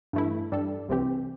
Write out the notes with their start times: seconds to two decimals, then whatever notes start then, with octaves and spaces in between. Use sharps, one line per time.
0.13 G2 E3 A3 E4
0.52 G2 G3 D4 A4
0.88 C2 C3 E3 C4 G4